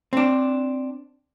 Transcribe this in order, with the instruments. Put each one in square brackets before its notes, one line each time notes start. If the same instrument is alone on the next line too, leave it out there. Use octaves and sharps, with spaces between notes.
[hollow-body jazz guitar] C4 D4